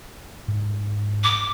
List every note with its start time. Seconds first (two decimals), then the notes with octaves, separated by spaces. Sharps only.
0.48 G#2
1.23 D6